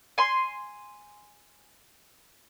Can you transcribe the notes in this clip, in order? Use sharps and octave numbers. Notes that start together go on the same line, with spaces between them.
G#5 C6